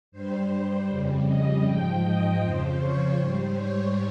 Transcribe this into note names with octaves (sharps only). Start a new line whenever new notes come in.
G2 G3 C5
F2 C#3 G3
D#5
G#2 F3 G5
D#5
F2 C#3 F3 C5
C#5
G#2 G3 C5
C#5